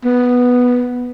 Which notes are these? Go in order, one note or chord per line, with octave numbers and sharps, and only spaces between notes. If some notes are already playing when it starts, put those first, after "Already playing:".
B3